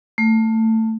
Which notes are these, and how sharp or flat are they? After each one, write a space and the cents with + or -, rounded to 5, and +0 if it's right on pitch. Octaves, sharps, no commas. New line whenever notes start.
A3 +20